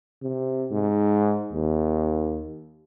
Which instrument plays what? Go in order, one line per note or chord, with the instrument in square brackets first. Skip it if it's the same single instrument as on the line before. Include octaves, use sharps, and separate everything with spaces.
[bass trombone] C3
G#2
D#2